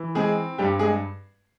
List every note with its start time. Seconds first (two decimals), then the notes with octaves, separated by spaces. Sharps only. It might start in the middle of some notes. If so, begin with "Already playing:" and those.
Already playing: E3
0.15 G#3 C4 G#4
0.58 G2 G3 G4
0.79 G#3 G#4